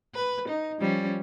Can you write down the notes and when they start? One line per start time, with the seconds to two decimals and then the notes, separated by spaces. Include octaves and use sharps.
0.15 B4
0.49 D#4
0.80 F3 G3 C#4